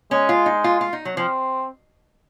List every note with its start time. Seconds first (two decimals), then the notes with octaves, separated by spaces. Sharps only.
0.11 G#3 C#4
0.29 F4
0.46 D#4
0.64 F4
0.81 F4
0.93 D#4
1.05 F#3
1.17 F3 C4